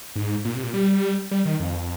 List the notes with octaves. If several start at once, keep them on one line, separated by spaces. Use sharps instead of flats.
G#2
A#2
C3
A#2
G3
G3
D#3
F2